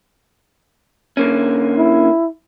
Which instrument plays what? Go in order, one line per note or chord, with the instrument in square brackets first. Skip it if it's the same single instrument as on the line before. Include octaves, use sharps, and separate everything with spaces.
[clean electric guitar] D3 A#3 C#4
[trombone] E4